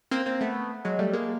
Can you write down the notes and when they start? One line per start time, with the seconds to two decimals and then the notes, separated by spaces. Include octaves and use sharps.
0.11 A#3 C4
0.26 A#3 C4
0.41 A3 B3
0.85 F#3 G#3
0.99 G3 A3
1.13 G#3 A#3